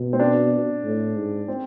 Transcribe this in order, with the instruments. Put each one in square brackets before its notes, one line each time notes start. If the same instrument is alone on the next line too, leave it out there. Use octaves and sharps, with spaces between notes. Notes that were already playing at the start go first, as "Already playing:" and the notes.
Already playing: [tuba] B2
[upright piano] C4
D4
[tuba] A2
G#2
[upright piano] C4